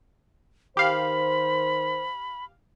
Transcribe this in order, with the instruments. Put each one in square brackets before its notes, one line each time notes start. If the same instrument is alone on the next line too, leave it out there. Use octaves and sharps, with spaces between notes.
[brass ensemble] D#3 C5 [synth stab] G4 F5 [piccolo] B5